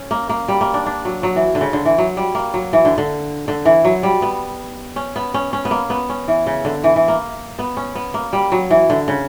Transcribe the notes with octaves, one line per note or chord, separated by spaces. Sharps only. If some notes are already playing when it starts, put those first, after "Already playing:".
Already playing: C#4
A#3
A#3
G3
A#3
D4
D4
F#3
F#3
E3
D3
C#3
D3
E3
F#3
G3
A#3
F#3
E3
D3
D3
D3
E3
F#3
G3
B3
C#4
B3
C#4
C#4
B3
A#3
B3
C#4
E3
C#3
D3
E3
E3
A#3
B3
C#4
B3
A#3
G3
F#3
E3
D3
C#3